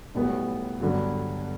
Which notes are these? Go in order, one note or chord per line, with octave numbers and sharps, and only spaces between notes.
B1 A2 G3 B3
G1 G2 D3 F#3